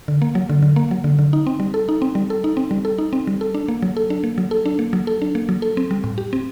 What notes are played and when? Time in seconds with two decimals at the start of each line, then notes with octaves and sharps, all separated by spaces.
0.08 D3
0.22 A#3
0.35 F#3
0.50 D3
0.62 D3
0.76 A#3
0.91 F#3
1.04 D3
1.19 D3
1.33 D#4
1.47 C4
1.60 G3
1.74 A4
1.89 D#4
2.02 C4
2.15 G3
2.30 A4
2.44 D#4
2.57 C4
2.71 G3
2.85 A4
2.98 D#4
3.13 C4
3.27 G3
3.41 A4
3.55 D4
3.68 A#3
3.82 F#3
3.97 A4
4.10 D4
4.24 A#3
4.38 F#3
4.51 A4
4.66 D4
4.79 A#3
4.93 F#3
5.07 A4
5.22 D4
5.35 A#3
5.49 F#3
5.62 A4
5.77 C4
5.91 G3
6.04 A2
6.18 G4
6.33 C4